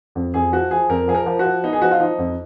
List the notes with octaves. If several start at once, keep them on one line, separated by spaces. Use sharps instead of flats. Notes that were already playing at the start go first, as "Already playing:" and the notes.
F2
F2 G#4
F3 F#4
F3 G#4
F2 A#4
F3 G#4
A#4
F3
F3 F#4
B3 D#4
G#4
F3 F#4
F4
F3 D#4
F2